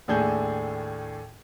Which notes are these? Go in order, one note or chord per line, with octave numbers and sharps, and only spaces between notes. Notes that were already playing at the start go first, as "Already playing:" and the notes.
D#2 A2 D4 G#4 A4 G6